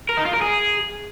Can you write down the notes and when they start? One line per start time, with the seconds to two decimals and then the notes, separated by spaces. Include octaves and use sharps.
0.09 A#4
0.17 D#4
0.25 F4
0.33 A#4
0.42 G#4